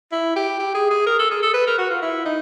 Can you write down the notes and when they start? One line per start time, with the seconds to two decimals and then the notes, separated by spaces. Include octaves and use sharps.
0.12 E4
0.36 G4
0.59 G4
0.74 G#4
0.91 G#4
1.06 A#4
1.19 A4
1.31 G#4
1.42 A4
1.54 B4
1.67 A#4
1.78 F#4
1.90 F4
2.02 E4
2.25 D#4